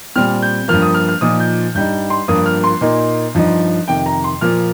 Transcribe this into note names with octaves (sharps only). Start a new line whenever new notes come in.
A#2 G3 C4 F6
G6
G2 F3 A#3 F6
D#6
F6
F6
A#2 F3 D#4 D#6
G6
G2 G3 D#4 G6
C6
G2 F3 A#3 F4 D#6
F6
C6
A#2 A#3 D#4
G2 F3 D#4
F2 C3 D#3 G5
A#5
C6
A#2 F3 A#3 F4 F6